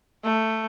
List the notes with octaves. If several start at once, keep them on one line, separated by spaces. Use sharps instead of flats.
A3